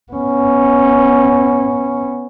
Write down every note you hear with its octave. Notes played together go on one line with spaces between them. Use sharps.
B3 C#4